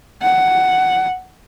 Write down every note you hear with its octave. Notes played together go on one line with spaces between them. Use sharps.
F#5